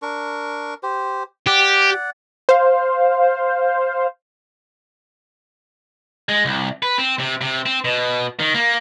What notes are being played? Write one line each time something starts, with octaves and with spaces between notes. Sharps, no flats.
D4 A#4 C#6
G4 C5
G4 D5 F#5
C5 F5
G#3
C2
B4
C4
C3
C3
C4
B2
D#3
A#3